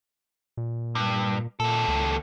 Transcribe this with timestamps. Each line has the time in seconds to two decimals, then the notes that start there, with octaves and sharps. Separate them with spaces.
0.57 A#2
0.95 G2
1.60 D#2 A#2 A4
1.88 C#2